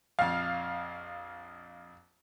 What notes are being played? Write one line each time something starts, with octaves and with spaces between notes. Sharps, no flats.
A#1 F2 F5